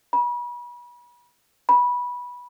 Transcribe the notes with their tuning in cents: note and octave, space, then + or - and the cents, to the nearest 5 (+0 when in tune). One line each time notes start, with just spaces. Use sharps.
B5 -35
B5 -15